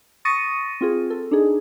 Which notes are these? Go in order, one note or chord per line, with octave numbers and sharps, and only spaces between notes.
C#6 D#6 A6 A#6 C#7 D#7
C4 F4 G#4
A4
D4 D#4 G#4